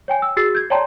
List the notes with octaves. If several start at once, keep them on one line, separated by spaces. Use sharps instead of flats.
C#5 G5 G#5
E6
F#4 G#4 E6 A6 C7
G6 G#6
C#5 D5 G5 A5 A#5 C6